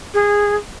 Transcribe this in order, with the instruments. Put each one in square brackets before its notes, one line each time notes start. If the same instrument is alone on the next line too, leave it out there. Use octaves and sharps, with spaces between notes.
[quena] G#4